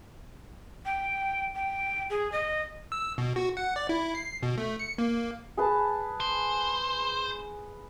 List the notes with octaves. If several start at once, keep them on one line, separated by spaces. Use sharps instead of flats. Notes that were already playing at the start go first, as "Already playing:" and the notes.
G5
G5
G#4
D#5
E6
B2
F#4
F#5
D5
E4
C7
B2
A3
C#7
A#3
G#4 B4 A5
C5